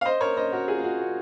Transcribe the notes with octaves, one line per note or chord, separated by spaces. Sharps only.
F5
C5 D#5
A#4 C#5
C5 D#5
F#4 A#4
F4 G#4
F4
F#4
F#4